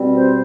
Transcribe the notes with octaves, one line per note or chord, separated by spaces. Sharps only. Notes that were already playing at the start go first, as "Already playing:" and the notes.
Already playing: B2 G3 C4
C5